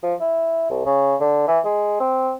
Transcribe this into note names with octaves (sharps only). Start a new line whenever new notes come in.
F3
E4
C2
C#3
D3
E3
G#3
C4